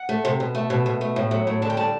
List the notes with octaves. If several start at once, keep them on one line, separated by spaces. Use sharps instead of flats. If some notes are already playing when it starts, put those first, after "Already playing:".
Already playing: F#5
A3
C3
B2
A3
B2
B2
A3
A2
F#3
A2
D3 A5
G5
G3 A5